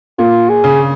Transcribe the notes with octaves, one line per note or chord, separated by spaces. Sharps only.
A#2 F4
G#4
C#3